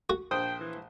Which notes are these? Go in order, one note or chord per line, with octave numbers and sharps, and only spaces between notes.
F#4
A#1 C5 G5 D#6
E3